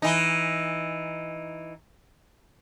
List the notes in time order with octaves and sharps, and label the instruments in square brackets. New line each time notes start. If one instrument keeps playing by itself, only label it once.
[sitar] E3 D#4